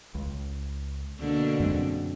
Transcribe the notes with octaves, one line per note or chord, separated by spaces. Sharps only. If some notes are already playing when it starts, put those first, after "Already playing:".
C#2
B2 D3 A#3
F#2 G#3 C4